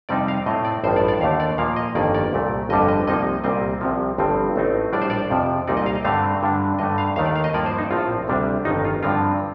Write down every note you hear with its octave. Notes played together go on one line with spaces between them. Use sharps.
F2 C3 G3 C4 D#4 D5
F5
A2 A3 C4 D#5
D5
A1 G2 F3 C5
D5
D5
D#2 D3 A3 F5
D5
A#2 F3 A#3 F5
D#5
G1 F2 D#3 A#3 D5
D5
C2 A#2 A3
G1 F2 D3 G3 D#5
D#5
C2 C3 F3 A#3 D#4 D#5
C2 A#2 G3 C4 D#5
C2 C3 F3
G1 G2 F3 C4
A1 A2 A3 C4 D#4
A#1 A2 G3 D4 D5
C5
D5
F2 C3 F3
C2 A#2 G3 C4 D#4 D5
D#5
F5
D#5
G2 D3 A3 C4 F5
G2 D3 G3 D4
G2 D3 A3 D#5
F5
D#2 D#3 A3 F5
D5
F5
D#5
G2 F3 A#3 D5
C5
D#4
A#1 A2 F3 C4 F4
D2 C3 G3 D4
G1 F2 D#3 D#4
F4
G2 D3 F3 C4 F4